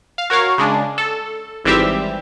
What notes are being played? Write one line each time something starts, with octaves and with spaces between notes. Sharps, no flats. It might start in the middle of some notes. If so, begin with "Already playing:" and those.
F5
F#4 A#4 C#5 F5
C#3 G#3 D4
A4
G#1 E3 G3 C4 G4 E5